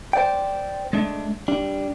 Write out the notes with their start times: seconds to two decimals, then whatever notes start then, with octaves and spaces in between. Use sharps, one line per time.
0.13 C5 D5 G5
0.93 G#3 A3 D4
1.48 G3 D4